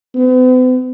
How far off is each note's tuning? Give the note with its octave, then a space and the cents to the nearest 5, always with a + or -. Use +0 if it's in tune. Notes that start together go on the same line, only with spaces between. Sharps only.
B3 +45